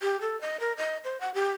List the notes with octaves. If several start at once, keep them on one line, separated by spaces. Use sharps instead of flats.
G4
A4
D#5
A#4
D#5
C5
F#5
G4